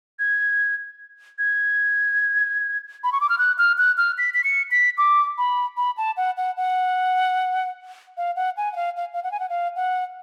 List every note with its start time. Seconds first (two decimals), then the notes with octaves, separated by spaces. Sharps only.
0.19 G#6
1.39 G#6
3.04 B5
3.12 C#6
3.21 D6
3.29 F6
3.38 F#6
3.58 F6
3.78 F#6
3.98 F6
4.18 B6
4.34 B6
4.44 C#7
4.71 B6
4.98 D6
5.38 B5
5.77 B5
5.97 A5
6.17 F#5
6.37 F#5
6.57 F#5
8.17 F5
8.36 F#5
8.57 G#5
8.73 F#5
8.76 F5
8.96 F5
9.13 F5
9.23 F#5
9.31 G#5
9.40 F#5
9.50 F5
9.76 F#5